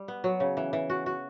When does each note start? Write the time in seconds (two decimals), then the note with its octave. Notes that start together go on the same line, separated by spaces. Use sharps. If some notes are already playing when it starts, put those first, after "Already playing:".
Already playing: G3
0.08 B3
0.24 F#3
0.40 C#3
0.57 E3
0.73 E3
0.90 F#4
1.06 F#4